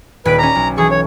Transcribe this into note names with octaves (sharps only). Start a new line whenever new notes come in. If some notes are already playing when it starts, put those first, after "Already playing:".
D#1 B4 B6 D7
C#4 A#5 D6
B1
E3 G#4 A4 C#6
C#5